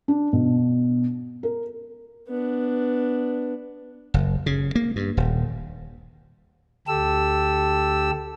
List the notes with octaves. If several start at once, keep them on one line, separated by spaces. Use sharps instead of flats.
D4
B2
A#4
B3 D4
F#1
C#3
A#3
G2
D#1
D2 G4 A4 E6